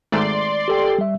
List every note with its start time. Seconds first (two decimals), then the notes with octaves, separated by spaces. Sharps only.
0.12 G#1 G#2 A3 D5 C6
0.68 G4 A4 G5
0.98 G3 E5